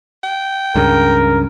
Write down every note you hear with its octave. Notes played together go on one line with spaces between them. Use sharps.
G5
C#2 G2 C#3 A#4